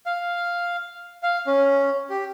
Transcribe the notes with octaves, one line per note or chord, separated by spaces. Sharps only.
F5
F5
C#4
G4